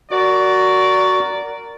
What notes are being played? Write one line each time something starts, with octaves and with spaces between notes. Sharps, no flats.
F#4 A#4 D5